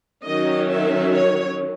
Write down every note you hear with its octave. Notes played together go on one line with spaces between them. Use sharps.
D#3 F#3 C#4 D#5
E5
C#5